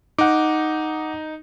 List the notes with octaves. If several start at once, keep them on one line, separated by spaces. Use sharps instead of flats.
D#4 F#5 D6